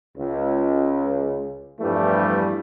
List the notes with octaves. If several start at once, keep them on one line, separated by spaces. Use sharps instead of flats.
C#2
E2 G2 E3 F3 G3 A3